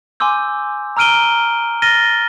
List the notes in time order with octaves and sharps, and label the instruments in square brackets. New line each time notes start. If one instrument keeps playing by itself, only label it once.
[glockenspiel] G#5 C6 D6 E6 G6
A#5 E6 F6 D7 D#7 G7
F6 A6 A#6 D#7 G7